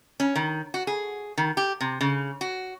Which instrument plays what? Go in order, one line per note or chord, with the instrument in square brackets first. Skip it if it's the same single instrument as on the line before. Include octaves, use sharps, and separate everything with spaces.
[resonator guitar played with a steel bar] C#4
D#3
F#4
G#4
D#3
G4
C3
C#3
F#4